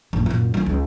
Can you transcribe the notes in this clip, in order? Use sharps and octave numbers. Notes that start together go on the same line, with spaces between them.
A#1 F#2
F#2 A#2
F#3 C#4
C#2